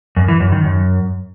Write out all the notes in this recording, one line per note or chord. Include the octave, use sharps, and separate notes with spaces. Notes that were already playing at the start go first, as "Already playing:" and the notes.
F#2
E3
F#2
D#3
F#2